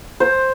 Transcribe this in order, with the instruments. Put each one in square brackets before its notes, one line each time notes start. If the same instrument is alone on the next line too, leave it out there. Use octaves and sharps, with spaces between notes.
[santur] C5